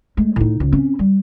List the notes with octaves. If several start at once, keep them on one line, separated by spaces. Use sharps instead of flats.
G#3 A3
A2 D#4
C#2
C4 C#4
G3